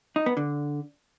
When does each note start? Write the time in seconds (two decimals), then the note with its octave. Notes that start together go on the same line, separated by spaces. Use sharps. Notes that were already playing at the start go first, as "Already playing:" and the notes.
0.16 D#4
0.26 B3
0.37 D3